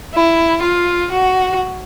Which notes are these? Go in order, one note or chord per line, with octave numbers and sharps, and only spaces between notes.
E4
F4
F#4